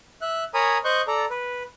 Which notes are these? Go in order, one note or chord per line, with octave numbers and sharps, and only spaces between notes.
E5 F#6
A#4 C#5 G#5 A#5 B5 D#6
C5 D#5 C#6 F#6 G6
A4 D5 A#5
B4